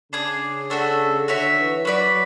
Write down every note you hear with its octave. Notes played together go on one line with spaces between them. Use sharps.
C#3 D4 G#4 D5
A3 D4 F#4 A4
D3 F#4 C#5 E5
E3
F#3 F#4 B4 D5